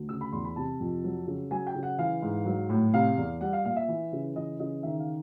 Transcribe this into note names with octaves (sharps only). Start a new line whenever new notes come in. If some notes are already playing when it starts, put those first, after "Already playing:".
Already playing: D2
C#3 E6
B5
E2 C6
B5
C3 A5
F2
F#3
C#3
F#3 G#5
G5
C#3
F#5
E3 F5
G#2
F#3
A2
C3 F5
E2
G3 F#5
F5
A#2 F5
E5
E3
C#3
E3 D#5
C#3 D#5
D#3 E5
F5